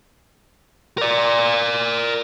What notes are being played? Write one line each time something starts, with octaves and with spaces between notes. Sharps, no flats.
A#4 D5